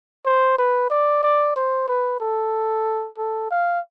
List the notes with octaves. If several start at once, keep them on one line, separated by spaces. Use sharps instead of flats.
C5
B4
D5
D5
C5
B4
A4
A4
F5